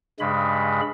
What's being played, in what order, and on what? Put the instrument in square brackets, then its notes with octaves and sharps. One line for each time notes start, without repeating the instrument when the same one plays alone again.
[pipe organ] G2 C#3 G#3 B5